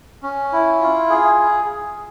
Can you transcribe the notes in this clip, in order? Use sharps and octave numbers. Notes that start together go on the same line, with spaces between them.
C#4
E4
F4
G#4